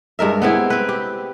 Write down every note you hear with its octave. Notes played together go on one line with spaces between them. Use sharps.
G2 G#3 A#4 E5
B3 C4 E4 G#4
C4 B4
G4